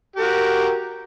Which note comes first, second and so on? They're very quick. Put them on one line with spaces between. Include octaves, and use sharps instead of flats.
G4 A#4 F#4